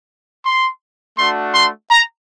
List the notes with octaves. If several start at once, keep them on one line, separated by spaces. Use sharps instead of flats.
C6
A3 D4 F#4 C6
C6
A#5